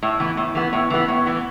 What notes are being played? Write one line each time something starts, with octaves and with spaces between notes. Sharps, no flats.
A2
E3 B3
A2
E3 B3
A2
E3 B3
A2
E3 B3